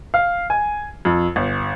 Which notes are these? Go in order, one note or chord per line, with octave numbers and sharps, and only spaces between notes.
F5
G#5
F2
G1